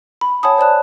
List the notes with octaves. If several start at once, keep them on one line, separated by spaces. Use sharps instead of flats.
B5
C#5 F#5 G#5 A5 B5 D#6
C5 D5 A5 F#6